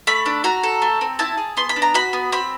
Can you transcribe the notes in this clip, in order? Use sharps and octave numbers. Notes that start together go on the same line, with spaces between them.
A3 B5
D4
F#4 A#5
A4
A3
C4
E4 A5
G#4
B3 C6
B5
D4
A#5
F#4 B5
B3
C4 B5